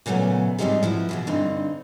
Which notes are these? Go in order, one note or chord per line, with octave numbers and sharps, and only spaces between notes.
A#2 C#3 F#3 A3 B3
G#2 F3 G3 C4 D#4 G#4
F3 E4 F#4 B4
B2 E3 G#4
G2 D3 C4 D#4